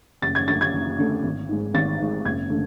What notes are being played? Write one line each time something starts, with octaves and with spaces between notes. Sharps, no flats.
F#1 A6
G#6
F#2 D3 A3 A6
G#6
F#1
F#2 D3 A3
G#1
G#2 G#3
G#1 A6
G#2 G#3
F#1 G#6
D3 A3